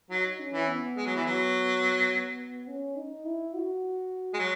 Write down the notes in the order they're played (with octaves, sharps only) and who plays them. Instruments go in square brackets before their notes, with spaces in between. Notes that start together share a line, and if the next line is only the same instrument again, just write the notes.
[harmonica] F#3 [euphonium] D#4
[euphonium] C#4
[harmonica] E3
[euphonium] B3
[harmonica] G#3
F#3
E3
F#3
[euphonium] C#4
D#4
E4
F#4
[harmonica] G#3
F#3